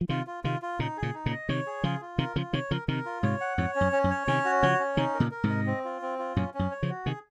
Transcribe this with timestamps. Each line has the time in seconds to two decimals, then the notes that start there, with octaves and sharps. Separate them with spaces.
0.01 F3
0.09 C3 D#3 F4
0.27 F4
0.44 C3 D#3 F4
0.62 F4
0.79 A#2 C#3 D#4
0.97 G#4
1.03 A#2 C#3
1.14 D#4
1.26 A#2 C#3
1.31 D#5
1.49 C3 D#3 C#5
1.67 G#4
1.84 C#3 F3 F4
2.01 F4
2.18 C3 D#3 A#4
2.36 C#3 F3 F4
2.53 C3 D#3 C#5
2.71 C#3 F3 A#4
2.88 C3 D#3 A#4
3.06 F4
3.23 G#2 C3 C#5
3.41 F#5
3.58 F2 G#2 C#5
3.75 C#4
3.81 F#2
3.92 C#4
4.04 F#2
4.10 C#5
4.27 C3 D#3 C#4
4.45 F#4
4.62 C#3 F3 C#5
4.79 C#4
4.97 C3 D#3 D#4
5.14 A#4
5.20 A#2 C#3
5.31 A#4
5.44 G#2 C3
5.50 D#5
5.67 C4
5.85 F4
6.02 C4
6.19 F4
6.36 F#2 A#2 C#4
6.54 C#4
6.59 F#2
6.71 C#5
6.83 C#3 F3
6.89 F#4
7.06 C3 D#3 G#4